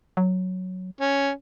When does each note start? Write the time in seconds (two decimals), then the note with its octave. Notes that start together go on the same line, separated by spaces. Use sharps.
0.17 F#3
1.00 C#4